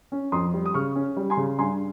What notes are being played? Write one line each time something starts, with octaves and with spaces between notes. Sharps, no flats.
C#4
F2 C6 D#6
G3
D#6
C#3 C#6 F6
C#4
G3
G#5 C6
C#3
G2 G#5 C6